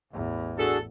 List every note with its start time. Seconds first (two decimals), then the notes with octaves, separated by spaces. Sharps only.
0.12 A1 E2
0.58 D4 F#4 G#4 A4